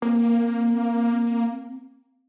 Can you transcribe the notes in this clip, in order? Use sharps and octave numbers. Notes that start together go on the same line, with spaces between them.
A#3 C4